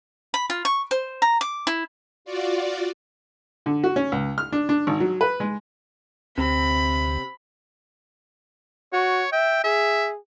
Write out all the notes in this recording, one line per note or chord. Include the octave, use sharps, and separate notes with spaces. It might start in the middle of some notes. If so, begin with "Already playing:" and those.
B5
F4
C#6
C5
A#5
D6
E4
F4 F#4 D5
D3
F#4
C#4
C#2
F6
D4
D4
G#1
F#3
B4
G#3
D2 C3 C4 B5
F#4 C#5
E5 G5
G#4 E5